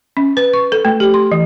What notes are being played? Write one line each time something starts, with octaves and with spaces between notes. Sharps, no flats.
C#4
B4
C#6
A4
A3
G4
C6
E3